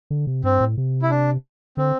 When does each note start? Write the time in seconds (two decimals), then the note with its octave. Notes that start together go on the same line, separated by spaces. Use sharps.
0.10 D3
0.27 C3
0.43 G2 C4
0.60 A2
0.77 C3
1.02 E4
1.10 D4
1.77 D3 C4